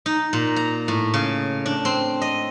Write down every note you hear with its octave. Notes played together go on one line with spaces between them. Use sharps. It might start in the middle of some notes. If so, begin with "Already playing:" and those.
D#4
A#2
A#5
A2
C#3
D4
C4
D#5